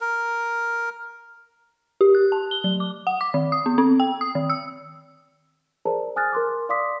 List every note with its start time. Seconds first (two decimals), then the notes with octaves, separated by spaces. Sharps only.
0.01 A#4
2.01 G4
2.15 F#6
2.32 A5
2.51 G7
2.64 F#3
2.80 D6
3.07 F#5
3.21 D6
3.34 D#3
3.52 D#6
3.66 B3
3.78 C4
4.00 G5
4.21 D#6
4.35 D#3
4.50 E6
5.85 G#4 A#4 C5 D5 A5 A#5
6.16 G#5 D#6 F6 F#6 A6
6.33 A#4 C6 D6
6.69 D5 F5 C6 D6 D#6 B6